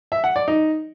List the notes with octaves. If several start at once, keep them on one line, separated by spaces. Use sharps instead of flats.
E5
F#5
D5
D#4